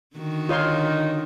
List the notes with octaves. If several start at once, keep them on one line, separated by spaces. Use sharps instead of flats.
D3 D#3 F#4
D#4 F4 C#5 C6